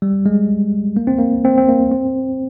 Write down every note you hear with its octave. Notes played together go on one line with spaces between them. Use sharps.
G3
G#3
A#3
C4
A#3
C4
C4
A#3
C4